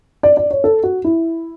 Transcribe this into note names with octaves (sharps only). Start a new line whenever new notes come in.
D5
D5
C#5
A4
F#4
E4